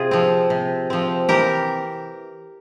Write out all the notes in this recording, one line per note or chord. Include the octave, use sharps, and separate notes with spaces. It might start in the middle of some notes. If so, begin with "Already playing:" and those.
Already playing: C3 F4 G#4
F3 C4
C3
F3 C4
E3 G4 A#4